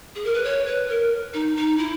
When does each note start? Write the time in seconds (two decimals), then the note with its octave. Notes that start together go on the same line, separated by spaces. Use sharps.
0.15 G#4
0.24 A#4
0.34 B4
0.44 C#5
0.66 B4
0.89 A#4
1.33 D#4
1.56 D#4
1.78 E4